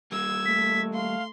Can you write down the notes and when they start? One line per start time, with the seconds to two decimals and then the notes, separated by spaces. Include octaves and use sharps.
0.12 G3 A#3 E6 G#6
0.46 A3 B6
0.94 F5 C6